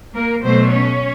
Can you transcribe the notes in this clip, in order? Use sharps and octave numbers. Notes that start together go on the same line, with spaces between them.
A#3 A#4
B2 F#3 A3 C4 C5
C#4 C#5